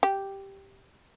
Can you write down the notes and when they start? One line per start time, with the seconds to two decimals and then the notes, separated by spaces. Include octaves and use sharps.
0.03 G4